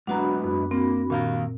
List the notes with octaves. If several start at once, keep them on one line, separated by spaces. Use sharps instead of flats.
G#2 F#3 B3 D4 F#4 F#5 A#5 B5
F#2
A#3 C4
D#2 A#2 F5 A#5